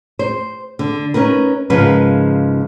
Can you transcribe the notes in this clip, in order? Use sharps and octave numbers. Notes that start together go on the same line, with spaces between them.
C5
D3
C#4 D#4 A#4 B4
G#2 C#3 F3 A#4 B4 G#5